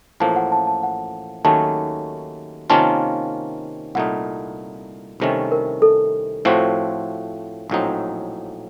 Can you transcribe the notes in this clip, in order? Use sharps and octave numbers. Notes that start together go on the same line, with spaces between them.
A1 A2 F3 A#3 A5
F#5
A5
A5
F#5
D#2 D#3 F#3 A3 C#4 A5
C3 D#3 A#3 C#4 F4 A5
C2 A#2 A3 D#4 F#5
C2 C3 D#3 A3 C#4
A#4
A4
A2 F3 A3 C4 F#4
A#1 A2 F#3 C4 D#4